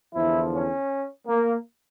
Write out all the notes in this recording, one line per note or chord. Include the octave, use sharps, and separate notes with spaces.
E2 D3 F3 E4
C#4
A#3